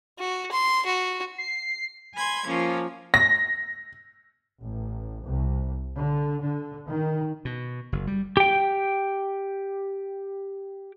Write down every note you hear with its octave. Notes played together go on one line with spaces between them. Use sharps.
F#4
C6
F#4
C7
G#5 B5 C6 G#6
F3 A#3 C#4
A#6
A1
C2
D3
D3
D#3
B2
F#1
G3
G4 G5